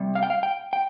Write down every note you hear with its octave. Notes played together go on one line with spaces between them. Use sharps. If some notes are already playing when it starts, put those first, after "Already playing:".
Already playing: C3 G3
F5
G5
F5
G5
G5